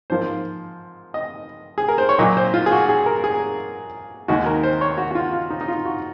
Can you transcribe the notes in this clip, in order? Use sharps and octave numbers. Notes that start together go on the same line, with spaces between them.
G#2 F3 A#3 C5
D#5
G#4
A#4
C5
C#5
A#2 F#3 A#3 D#5
C5
F4
G#4
F#4
G#4
A#4
G#4
D#2 D#3 G#3 F#4
A#4
C5
C#5
F#4
F#4
F4
F4
D#4
D#4
F4
F#4